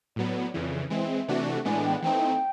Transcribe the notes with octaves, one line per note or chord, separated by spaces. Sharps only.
A2 F#3 B3 D5
F2 C#3 E3
E3 G#3 C4 E5
C3 E3 A3 D4 F#4
A2 E3 G#3 B3 D4 G#5
G5
F#5
E3 A3 C4 D#4 G5